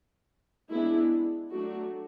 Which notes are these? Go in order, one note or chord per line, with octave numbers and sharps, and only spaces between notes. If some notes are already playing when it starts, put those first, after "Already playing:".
G#3 B3 D4 E4
F#3 A3 D4 F#4